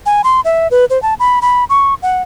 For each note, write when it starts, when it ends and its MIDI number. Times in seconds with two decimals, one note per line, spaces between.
0.06 0.22 80
0.24 0.41 84
0.45 0.68 76
0.71 0.85 71
0.90 1.01 72
1.03 1.14 81
1.20 1.39 83
1.42 1.64 83
1.70 1.94 85
2.03 2.22 78